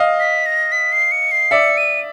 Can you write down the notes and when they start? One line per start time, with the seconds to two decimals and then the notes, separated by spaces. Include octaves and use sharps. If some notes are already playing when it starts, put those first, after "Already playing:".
Already playing: D#5 F5
0.19 B6
0.46 A#6
0.72 B6
0.92 C7
1.11 C#7
1.31 C7
1.51 D5 E5 C#7
1.77 D#7